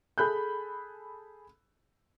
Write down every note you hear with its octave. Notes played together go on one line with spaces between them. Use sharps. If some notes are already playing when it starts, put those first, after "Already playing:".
G#4 A4 B5 F#6 G6